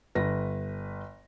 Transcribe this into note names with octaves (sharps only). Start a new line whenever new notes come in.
G1 B4 A#6